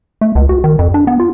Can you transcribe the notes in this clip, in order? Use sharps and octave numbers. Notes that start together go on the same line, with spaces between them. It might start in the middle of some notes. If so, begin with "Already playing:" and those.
A3
C#2
F#4
D#3
F2
D4
B3
F4